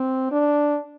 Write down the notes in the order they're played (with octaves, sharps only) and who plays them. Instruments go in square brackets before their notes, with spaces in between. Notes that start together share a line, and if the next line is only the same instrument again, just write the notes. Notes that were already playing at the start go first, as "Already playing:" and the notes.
Already playing: [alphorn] C4
D4